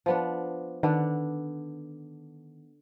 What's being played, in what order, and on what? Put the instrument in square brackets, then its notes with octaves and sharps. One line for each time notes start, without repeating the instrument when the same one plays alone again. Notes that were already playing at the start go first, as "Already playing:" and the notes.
[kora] F3 B3 D4
[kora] D3 B3 D4 [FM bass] D#3